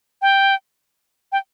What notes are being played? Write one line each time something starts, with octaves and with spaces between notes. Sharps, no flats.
G5
G5